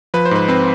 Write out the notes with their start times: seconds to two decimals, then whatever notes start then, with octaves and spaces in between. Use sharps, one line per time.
0.14 F3 B4
0.25 C5
0.31 G#2 B4
0.48 C4 B4